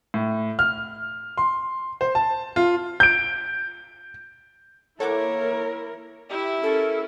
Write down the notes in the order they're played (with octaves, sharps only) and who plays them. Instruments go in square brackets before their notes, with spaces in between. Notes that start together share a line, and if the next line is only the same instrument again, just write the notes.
[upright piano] A2
F6
C6
C5
A5
F4
[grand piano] G6 D7
[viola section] A#3 E4 [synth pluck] A4 F#5 D6 [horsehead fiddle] A#4 [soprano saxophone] C#5
[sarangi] E4 [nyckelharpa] G4 E5
[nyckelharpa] C#4 A#4 [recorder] A4